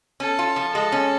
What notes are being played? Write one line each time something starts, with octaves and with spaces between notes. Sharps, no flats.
C#4 A4
F4
F3
G#3 A4
C#4